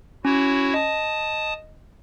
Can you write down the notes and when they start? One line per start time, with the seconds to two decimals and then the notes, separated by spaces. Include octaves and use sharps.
0.25 C#4 E4 F#4 C#5
0.74 D#5 A5 D#6